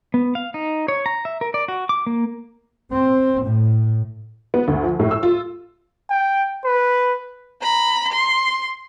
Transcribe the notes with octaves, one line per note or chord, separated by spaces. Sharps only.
B3
F5
D#4
C#5
A#5
E5
A#4
D5
F#4
D6
A#3
C4
A2
B3
D2
F3
A2
E6
F4
G5
B4
A#5 B5
C6